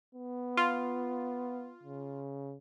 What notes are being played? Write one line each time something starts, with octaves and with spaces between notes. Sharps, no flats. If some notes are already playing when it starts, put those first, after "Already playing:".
B3
F4
C#3